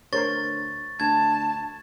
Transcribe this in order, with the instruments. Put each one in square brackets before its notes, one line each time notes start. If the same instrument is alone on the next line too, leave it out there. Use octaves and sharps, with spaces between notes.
[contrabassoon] D2 [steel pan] A#4 C5 C#5 [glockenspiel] C#6 A6
[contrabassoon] D2 [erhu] A5 [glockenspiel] G#6